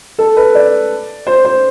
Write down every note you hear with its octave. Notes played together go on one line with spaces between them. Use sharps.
A4
B4
D5
C5
C5